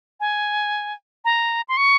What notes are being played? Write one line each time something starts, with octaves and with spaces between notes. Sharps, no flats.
G#5
A#5
C6
C#6